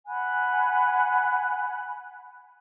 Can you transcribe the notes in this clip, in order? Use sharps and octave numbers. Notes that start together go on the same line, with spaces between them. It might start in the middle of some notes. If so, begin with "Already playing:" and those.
F#5 G#5 B5 F#6